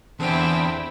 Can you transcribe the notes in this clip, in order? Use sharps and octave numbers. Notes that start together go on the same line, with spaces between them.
E2 D3 C4 E4 G5